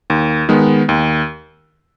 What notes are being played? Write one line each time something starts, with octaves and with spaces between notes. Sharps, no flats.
D#2
D#3 G#3 B3
D#2